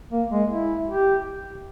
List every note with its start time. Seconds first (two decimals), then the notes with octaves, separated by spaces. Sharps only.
0.11 A#3
0.31 G#3
0.49 E4
0.88 G4